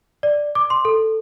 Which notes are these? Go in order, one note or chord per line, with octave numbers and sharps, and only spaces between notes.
D5
D6
C6
A4